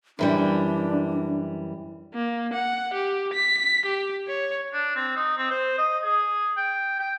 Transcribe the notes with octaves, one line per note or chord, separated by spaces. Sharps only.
F#2 E3 G3 D4
A#3
F#5
G4
B6
G4
C#5
D4
C4
D#4
C4
C5
D#5
G#4
G5
G5